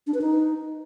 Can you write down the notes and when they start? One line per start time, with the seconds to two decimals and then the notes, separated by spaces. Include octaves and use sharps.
0.07 D4
0.14 B4
0.21 D#4